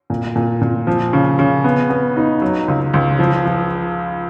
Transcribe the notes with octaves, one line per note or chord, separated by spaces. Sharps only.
A#2
A#2
A#2
F3
C#3
C#3
B3
B3
D#4
F#3
C#2
C#2
F3
F3